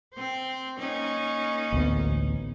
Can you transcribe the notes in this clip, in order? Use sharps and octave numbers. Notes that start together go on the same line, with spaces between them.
C4 C5
A#3 C#4 D#4
A1 D2 B3